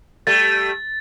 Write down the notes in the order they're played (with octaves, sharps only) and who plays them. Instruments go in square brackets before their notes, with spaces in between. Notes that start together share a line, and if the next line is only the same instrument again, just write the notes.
[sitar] G3 A3 [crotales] A6